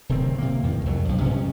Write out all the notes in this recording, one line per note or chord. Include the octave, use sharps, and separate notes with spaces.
D1 C3 D#3 C4
C3 A#3
E2 A2 D#3
C2 F2 F#3
B1 G2 F3
G2 C3 F3 C#4